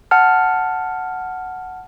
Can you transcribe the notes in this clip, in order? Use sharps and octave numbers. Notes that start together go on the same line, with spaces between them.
F#5 A5 F6